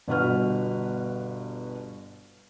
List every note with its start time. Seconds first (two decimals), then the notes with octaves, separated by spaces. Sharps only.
0.08 G1 B2 F#4 B4 F#5 F6